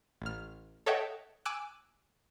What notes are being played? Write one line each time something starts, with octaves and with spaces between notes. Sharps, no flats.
A1 F6
A4 C#5 D#5 E5 F#5 G5
G#5 D6 E6 F#6